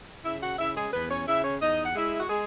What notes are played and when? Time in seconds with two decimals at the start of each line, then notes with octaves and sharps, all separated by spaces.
0.24 C#3 E4 E5
0.42 F#4 F#5
0.58 C#3 E4 E5
0.76 G#3 G#4
0.93 E2 B3 B4
1.10 C#4 C#5
1.27 C#3 E4 E5
1.44 C#4 C#5
1.61 E2 D#4 D#5
1.85 F#5
1.95 G#3 E4 E5
2.20 F#4
2.30 G#3 G#4